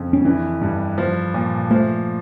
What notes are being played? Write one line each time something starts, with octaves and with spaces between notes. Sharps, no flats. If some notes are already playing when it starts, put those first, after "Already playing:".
Already playing: F2 C#3
C#4
E3 D4
G2
F3
A#2
F3 A3